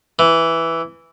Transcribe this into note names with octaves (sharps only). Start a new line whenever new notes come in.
E3